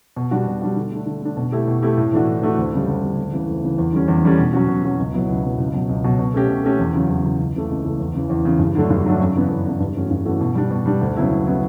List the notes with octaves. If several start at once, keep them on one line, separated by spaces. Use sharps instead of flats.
B2
G3 D4 F#4
B2
G3 D4 F#4
D3
A3 D4
D3
A3 D4
B2
A3 E4 G4
B2
A3 E4 G4
A2
E3 A3 D4 F#4
A2
E3 A3 D4 F#4
D2
C#3 G3
D2
C#3 G3
D2
C#3 E3
D2
C#3 E3
E2
D3 G3 C#4
E2
D3 G3 C#4
B2
F#3 C#4 F#4
B2
F#3 C#4 F#4
C#2
B2 F#3 B3 E4
C#2
B2 F#3 B3 E4
C#2
B2 F#3
C#2
B2 F#3
B2
A3 C#4 G4
B2
A3 C#4 G4
E2
C#3 F#3
E2
C#3 F#3
C#2
C#3 E3 A3
C#2
C#3 E3 A3
E2
C#3 E3
E2
C#3 E3
G2
D3 F#3 A3 D4
G2
D3 F#3 A3 D4
F#2
C#3 E3 B3 D4
F#2
C#3 E3 B3 D4
G2
E3 A3 C#4 F#4
G2
E3 A3 C#4 F#4
B2
G3 D4
B2
G3 D4
D2
C#3 F#3 B3 E4
D2
C#3 F#3 B3 E4